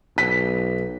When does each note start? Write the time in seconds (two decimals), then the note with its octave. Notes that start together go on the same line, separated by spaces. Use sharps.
0.18 B1 B6